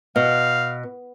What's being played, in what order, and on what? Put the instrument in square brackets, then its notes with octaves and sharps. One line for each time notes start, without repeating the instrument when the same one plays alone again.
[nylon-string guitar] B2 [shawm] F5